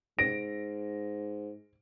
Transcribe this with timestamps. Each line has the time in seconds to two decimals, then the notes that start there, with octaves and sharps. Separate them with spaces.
0.19 G#2 A#6 D7